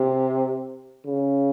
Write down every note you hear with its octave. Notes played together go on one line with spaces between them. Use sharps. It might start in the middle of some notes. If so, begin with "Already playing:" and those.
Already playing: C3
C#3